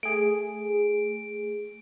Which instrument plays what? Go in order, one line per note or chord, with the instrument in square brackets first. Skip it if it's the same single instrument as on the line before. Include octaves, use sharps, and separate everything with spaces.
[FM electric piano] A3 G#4 [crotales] D7